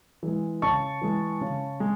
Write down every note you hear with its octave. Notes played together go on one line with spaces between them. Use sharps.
E3 G#3
C#3 A5 C#6
E3 G#3
C#3
G#3